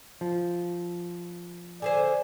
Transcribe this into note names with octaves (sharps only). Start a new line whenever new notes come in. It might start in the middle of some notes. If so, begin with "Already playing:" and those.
F3
D3 G#4 C5 D5 G#5